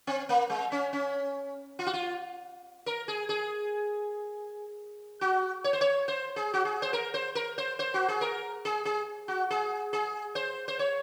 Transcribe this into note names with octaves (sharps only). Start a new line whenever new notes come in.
C4
A#3
G#3
C#4
C#4
F4
F#4
F4
A#4
G#4
G#4
F#4
C#5
C5
C#5
C5
G#4
F#4
G#4
C5
A#4
C5
A#4
C5
C5
F#4
G#4
A#4
G#4
G#4
F#4
G#4
G#4
C5
C5
C#5